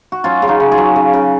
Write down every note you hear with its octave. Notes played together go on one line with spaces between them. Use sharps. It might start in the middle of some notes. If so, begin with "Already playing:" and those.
F#4
F#3 C#4 F4
C#3 F4
D#4 F#4
C#3
F4 G#4
F#3
C#3
C#3